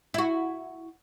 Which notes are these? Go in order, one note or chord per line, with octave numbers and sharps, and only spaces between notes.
E4 F#4